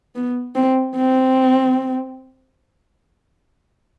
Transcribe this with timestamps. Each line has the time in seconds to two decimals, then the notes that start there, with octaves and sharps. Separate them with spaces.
0.15 B3
0.55 C4
0.96 C4